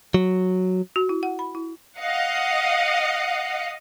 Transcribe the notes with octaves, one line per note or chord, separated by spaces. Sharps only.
F#3
F#4
E4
F#5
B5
E4
D#5 F5 F#5